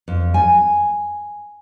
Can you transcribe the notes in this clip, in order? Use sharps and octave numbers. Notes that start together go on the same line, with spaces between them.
F2
G#5